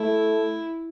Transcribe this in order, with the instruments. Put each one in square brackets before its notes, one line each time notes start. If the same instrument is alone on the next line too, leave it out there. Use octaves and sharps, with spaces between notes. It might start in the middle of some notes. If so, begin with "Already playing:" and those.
Already playing: [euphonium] A3 [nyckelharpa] E4